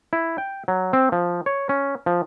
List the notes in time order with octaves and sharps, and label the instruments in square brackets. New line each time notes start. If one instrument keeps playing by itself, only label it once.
[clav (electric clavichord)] E4
G5
F#3
C4
F3
C#5
C#4
F3